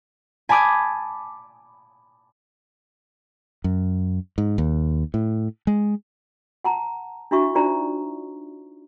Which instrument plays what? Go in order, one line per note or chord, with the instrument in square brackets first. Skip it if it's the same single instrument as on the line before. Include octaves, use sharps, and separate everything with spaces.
[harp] G#5 A5 B5 D6 D#6 G#6
[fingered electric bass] F#2
G#2
D#2
A2
G#3
[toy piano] F#5 A5 A#5
D4 E4 F#4 E5 C#6
D4 D#4 F4 C5 D5 A#5